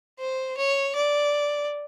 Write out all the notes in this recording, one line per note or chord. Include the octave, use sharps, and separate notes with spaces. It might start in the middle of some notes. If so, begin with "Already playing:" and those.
C5
C#5
D5